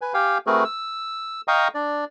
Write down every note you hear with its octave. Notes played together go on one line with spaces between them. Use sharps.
B4 G#5
G4 F5 G5 G#5
A3 C4 F#4 G#4 A#4 B4
E6
D#5 F5 G5 A#5 C#6 D#6
D4 D5